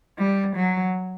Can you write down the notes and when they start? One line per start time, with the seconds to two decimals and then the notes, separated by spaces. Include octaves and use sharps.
0.18 G3
0.56 F#3